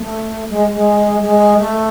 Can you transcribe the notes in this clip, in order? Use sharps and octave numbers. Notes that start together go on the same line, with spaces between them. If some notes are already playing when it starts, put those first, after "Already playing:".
Already playing: A3
G#3
G#3
G#3
A3